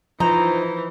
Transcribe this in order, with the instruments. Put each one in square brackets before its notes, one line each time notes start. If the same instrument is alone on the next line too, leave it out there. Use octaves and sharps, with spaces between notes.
[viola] E3 [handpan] F3 [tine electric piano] D#4 C5 D#5 [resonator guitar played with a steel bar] A#5